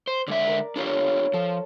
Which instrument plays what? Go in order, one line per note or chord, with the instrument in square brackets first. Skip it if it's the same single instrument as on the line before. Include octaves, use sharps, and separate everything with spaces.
[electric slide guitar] C5
[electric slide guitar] D3 G#3 E5 [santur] D5
[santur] A#4
[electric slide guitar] D4 F4 G4 [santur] C#5 F5 A5
[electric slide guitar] F3 [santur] A4